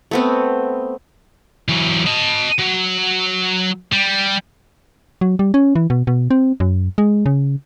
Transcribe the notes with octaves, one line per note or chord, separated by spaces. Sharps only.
A3 B3 C4
E3 F#3
D#5 A5
F#3
G3
F#3
G3
C#4
E3
B2
B2
C4
F#2
G#3
C#3